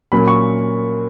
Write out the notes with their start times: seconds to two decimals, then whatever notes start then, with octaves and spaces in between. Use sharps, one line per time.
0.12 A#2 F#3 A#3 C#4 B5
0.28 C#6